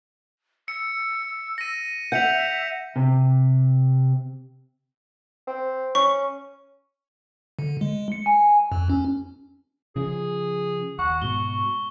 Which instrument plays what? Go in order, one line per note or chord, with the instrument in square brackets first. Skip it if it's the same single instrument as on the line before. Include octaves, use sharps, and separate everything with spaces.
[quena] E6 [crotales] C#7
[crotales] A#6 D#7
[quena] E5 [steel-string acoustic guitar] F#5 [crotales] G6 C#7 F7
[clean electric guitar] C3
[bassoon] C4
[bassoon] C#4 [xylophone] C#6
[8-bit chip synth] D3
G#3
C#7
G#5
F2
C#4
[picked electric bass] C#3 F3 [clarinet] G#4
[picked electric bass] D#2 [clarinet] F#5 [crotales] C#6
[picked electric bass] G#2 B2 [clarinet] F#4 [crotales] G7